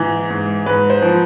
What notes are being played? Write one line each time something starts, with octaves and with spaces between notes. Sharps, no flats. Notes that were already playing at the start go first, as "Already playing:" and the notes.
Already playing: G#2 E3
G#2
G#2 B4
C5
F3